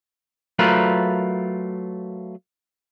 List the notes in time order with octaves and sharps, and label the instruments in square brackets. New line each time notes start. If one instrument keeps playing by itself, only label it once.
[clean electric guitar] F#3 A3 F4 A#4 B4